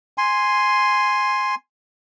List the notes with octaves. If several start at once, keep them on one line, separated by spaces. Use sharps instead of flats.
G#5 C6